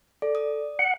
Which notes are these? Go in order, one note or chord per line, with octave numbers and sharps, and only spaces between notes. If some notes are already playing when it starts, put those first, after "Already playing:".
A4 D5
D#6
F#5